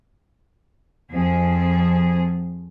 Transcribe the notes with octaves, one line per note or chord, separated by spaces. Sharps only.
F2 F3 G#4